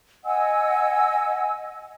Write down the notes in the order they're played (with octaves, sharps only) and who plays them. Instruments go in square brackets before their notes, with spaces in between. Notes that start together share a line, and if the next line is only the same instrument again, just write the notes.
[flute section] D#5 F#5 G#5 E6